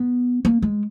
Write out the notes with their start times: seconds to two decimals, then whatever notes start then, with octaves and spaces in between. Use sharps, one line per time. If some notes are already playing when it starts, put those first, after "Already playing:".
Already playing: B3
0.45 A#3
0.62 G#3